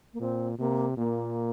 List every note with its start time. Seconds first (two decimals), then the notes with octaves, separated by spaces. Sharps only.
0.13 A#3
0.20 A#2 C4
0.59 C3 A#3
0.97 A#2 A#3